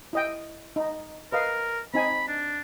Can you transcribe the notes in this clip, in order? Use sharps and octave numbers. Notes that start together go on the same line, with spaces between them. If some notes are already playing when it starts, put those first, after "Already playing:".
E4 D#5 G5
D#4
A#4 B4 D#5 F5
C4 D#4 G#5 B5
D4